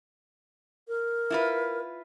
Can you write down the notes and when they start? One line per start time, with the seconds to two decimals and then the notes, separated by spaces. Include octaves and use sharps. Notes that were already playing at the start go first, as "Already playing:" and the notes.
0.88 A#4
1.30 E4 F4 B4